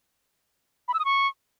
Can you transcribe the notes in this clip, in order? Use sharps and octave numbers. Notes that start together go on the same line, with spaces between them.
B5
E6
D#6
C#6